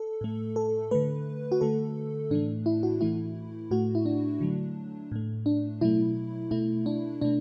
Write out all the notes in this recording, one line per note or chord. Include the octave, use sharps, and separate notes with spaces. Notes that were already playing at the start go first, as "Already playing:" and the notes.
Already playing: A4
A2 A3
A4
D3 A3 B4
F#4
D3 A3 A4
A2 E3 A3 D4
E4
F#4
A2 E3 A3 E4
A2 A3 F#4
E4
D4
D3 F#3 A3
A2 A3
D4
B2 F#3 A3 E4
B2 A3 E4
D4
B2 A3 D4